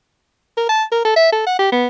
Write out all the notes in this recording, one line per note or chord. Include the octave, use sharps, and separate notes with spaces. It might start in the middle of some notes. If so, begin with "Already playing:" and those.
A#4
A5
A#4
A4
E5
A4
F#5
G4
B3